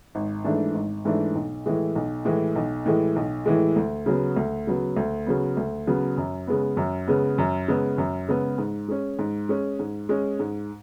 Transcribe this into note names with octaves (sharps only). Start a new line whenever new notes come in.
G#1
G#2 E3 A3 D4
G#1
G#2 E3 A3 D4
B1
A2 E3 G#3
B1
A2 E3 G#3
B1
A2 E3 G#3
B1
A2 E3 G#3
D2
C#3 F#3 B3
D2
C#3 F#3 B3
D2
C#3 F#3 B3
D2
C#3 F#3 B3
F#2
C#3 G#3 B3
F#2
C#3 G#3 B3
F#2
C#3 G#3 B3
F#2
C#3 G#3 B3
G#2
G#3 C#4
G#2
G#3 C#4
G#2
G#3 C#4
G#2